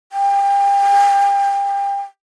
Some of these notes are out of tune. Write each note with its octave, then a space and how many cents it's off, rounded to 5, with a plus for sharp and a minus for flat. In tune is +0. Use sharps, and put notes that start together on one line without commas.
G5 +30